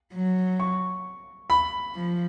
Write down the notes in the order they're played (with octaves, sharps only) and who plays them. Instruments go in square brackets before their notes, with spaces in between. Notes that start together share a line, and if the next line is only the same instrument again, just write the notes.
[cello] F#3
[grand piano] C#6
B5
[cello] F3